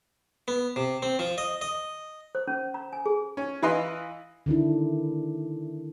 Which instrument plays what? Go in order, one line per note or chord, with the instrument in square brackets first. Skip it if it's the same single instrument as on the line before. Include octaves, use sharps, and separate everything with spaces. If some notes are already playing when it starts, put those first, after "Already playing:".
[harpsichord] B3
C3
C4
F3
D#5
D#5
[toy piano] C5
C#4
A#5
G#5
G#4
[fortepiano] C#4
E3 E4 B4 D#5 F5 C6
[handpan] D3 D#3 D4 E4